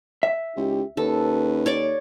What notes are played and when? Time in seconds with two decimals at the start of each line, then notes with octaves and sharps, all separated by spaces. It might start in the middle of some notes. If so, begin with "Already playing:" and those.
0.23 E5
0.56 C#2 D#4 E4 G4
0.97 D#2 C#4 A4 B4
1.66 C#5 D5 D6